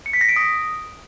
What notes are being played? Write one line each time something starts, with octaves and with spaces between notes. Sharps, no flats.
C#7
B6
A#6
D7
D#6